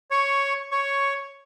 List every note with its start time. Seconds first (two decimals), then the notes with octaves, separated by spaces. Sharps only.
0.11 C#5 C#6
0.71 C#5 C#6